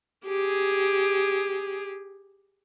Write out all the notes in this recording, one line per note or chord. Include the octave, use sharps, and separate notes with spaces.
G4 G#4